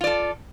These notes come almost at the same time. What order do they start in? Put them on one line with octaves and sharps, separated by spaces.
F4 D5 A4